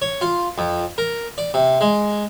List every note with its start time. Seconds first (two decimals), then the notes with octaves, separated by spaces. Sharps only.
0.02 C#5
0.21 F4
0.58 F2
0.98 A#4
1.38 D5
1.54 C3
1.81 G#3